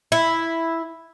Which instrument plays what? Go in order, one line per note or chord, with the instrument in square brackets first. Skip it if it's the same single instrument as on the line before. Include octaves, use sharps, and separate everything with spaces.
[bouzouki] E4